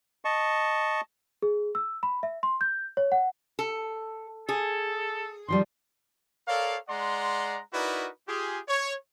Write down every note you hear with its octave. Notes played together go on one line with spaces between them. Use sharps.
D#5 A5 C#6
G#4
E6
B5
E5
C6
G6
C#5
F#5
A4
G#4 A4
D#3 F3 G3 C6
A4 A#4 C#5 D5 F5
G#3 D5 F#5 A#5 C6
D#4 E4 F#4 A#4 B4 D5
F4 G4 G#4
C#5